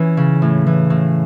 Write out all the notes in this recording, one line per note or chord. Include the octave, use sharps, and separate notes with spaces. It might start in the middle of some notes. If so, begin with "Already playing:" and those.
Already playing: E3 C#4
C#3
A2
E3
A2